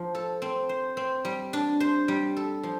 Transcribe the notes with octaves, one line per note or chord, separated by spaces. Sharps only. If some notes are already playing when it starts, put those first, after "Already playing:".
Already playing: F3
A4
C4
C5
C4
G3
D4
C5
G3
A4
F3